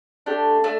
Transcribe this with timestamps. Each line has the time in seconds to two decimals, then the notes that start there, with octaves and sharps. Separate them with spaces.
0.26 A3 D4 G4
0.64 A3 D4